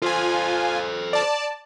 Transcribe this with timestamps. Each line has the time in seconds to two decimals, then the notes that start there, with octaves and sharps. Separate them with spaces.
0.02 F4 A4 C5 G#5
1.13 D5 A5